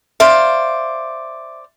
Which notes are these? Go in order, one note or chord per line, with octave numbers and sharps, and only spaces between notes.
C5 D5 E5 F5